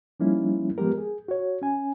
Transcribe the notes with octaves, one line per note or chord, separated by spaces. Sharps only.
F3 G3 A#3 C#4 D#4 E4
F3 G#3 B3 G4 A#4
G#4
F#4 C#5
C#4 G#5